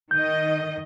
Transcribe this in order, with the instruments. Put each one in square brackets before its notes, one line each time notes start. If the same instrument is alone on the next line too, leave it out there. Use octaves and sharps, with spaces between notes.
[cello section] D#3 D#5 [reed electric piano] G6